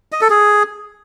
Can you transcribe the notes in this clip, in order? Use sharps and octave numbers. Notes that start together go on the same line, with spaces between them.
D#5
A4
G#4